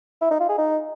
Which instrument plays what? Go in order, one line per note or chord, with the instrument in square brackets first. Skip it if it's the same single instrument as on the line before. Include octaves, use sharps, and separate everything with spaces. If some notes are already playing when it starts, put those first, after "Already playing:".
[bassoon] E4
D#4
F4
G#4
D#4